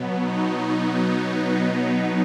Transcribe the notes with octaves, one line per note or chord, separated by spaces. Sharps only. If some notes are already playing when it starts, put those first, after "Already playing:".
Already playing: B2 F#3 B3
D#4